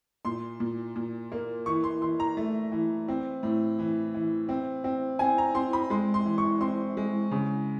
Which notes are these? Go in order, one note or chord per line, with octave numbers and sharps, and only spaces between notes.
A#2 C6
A#2
A#2
A#3
E3 C#6
C6
E3 C6
A#5
A3
E3
C4
A2
E3
E3
C4
C4
C4 G#5
A#5
C4 C6
B5
G#3 C6
C6
E3
C#6
C4 C6
G#3
C#3